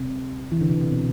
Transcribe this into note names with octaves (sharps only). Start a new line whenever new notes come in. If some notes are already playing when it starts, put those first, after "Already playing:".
Already playing: C3
E3
D3
C3
C3
B2